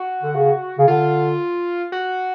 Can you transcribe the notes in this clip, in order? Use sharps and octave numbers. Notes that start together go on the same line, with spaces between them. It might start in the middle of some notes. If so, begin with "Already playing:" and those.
Already playing: F#4
D3
C#3
C#3
D3 F4
F#4